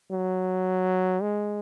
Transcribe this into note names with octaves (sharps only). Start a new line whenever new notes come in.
F#3
G#3